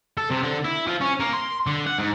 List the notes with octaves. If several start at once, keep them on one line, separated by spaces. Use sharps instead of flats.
A4
C3
D3
E4
F3
C#4
A#3
C6
D3
F#5
G#2